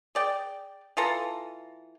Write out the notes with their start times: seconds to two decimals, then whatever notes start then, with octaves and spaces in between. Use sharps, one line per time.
0.15 G#4 D5 G5
0.97 E3 F4 A4 A#5